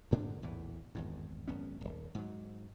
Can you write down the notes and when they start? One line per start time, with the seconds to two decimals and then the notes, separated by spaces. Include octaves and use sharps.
0.11 D2 G#2 D3 D4
0.42 A#1 E2 A2 E3
0.95 G#1 E2 G2
1.48 G#1 F#2 B3 C#4
1.81 D#1 B1
2.15 G#2 F#3